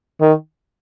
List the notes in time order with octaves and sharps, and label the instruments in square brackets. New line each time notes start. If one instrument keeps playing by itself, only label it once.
[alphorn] D#3